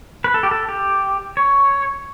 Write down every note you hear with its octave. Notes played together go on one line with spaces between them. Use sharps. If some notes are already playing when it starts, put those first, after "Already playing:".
B4
A4
G4
A4
G4
C#5